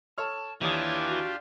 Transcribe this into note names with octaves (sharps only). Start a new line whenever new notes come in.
A4 C#5 A5 F6
D#2 E3 D4 F4 G4 C#5 D#6
F#4